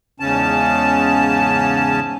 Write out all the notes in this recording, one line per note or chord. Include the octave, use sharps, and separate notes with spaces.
E2 G#2 C#3 C#4 A5